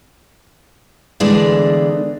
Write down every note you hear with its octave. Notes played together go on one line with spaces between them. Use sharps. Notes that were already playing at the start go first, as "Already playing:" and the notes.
D3 E3 G#3 A3 B3 D4